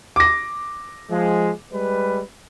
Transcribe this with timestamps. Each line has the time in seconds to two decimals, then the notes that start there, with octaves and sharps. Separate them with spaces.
0.16 D6 A#6
1.10 F3 G#3
1.72 G3 G#3 B4